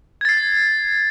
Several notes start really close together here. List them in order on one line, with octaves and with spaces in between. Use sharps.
G#6 A6 C7